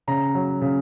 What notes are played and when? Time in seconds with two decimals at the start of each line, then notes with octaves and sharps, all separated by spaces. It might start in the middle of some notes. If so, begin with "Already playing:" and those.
0.07 C#3 A#5
0.34 F#3
0.61 C#3